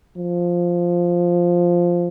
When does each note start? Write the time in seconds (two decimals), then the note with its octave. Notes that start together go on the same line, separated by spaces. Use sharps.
0.17 F3